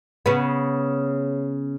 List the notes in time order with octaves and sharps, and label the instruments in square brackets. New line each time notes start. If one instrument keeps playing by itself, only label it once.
[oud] C#3 B3